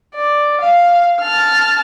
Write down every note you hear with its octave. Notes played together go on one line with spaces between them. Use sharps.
D5
F5
A5 F6